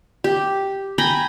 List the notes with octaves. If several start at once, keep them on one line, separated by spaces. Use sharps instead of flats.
G4
G5 G#5 A#5 B5